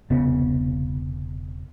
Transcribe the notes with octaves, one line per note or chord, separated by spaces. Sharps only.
E1 C2 C#3 B3